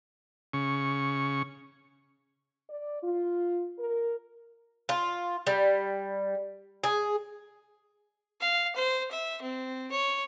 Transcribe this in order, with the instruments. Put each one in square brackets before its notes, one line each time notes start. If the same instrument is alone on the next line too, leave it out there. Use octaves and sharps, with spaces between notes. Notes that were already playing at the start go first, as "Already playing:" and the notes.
[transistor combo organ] C#3 C#6
[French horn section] D5
F4
A#4
[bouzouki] F4
G3
G#4
[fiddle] F5
C5
E5
C4
C#5